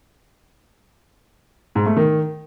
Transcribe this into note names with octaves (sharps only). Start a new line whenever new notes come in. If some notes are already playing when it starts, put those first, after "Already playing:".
G#2
A3
D#3